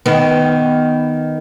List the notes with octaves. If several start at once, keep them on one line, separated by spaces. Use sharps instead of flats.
D#3 B3